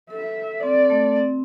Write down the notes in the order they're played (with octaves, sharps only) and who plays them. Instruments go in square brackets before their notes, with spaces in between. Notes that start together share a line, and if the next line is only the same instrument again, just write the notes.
[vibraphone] A4 [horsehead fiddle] E5
[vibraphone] C4 [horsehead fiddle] D5
[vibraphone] A3
C4